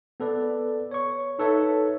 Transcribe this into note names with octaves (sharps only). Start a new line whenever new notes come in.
B3 A4 B4 D5
C#5 C#6
D#4 A4 B4 C#5 E5